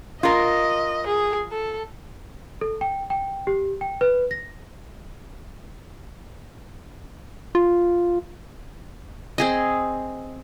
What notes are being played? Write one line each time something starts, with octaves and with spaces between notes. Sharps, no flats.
F4 A#4 D#5
G#4
A4
A4
G5
G5
G4
G5
B4
A#6
F4
C4 G#4 D#5